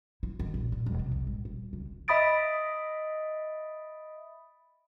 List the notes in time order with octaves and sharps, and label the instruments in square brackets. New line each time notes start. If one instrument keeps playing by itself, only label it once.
[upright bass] E4
D#3
A#1
A#2
E1
C3
C2
G#1
D#1
C#2
[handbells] D#5 E5 B5 D#6 A6 D7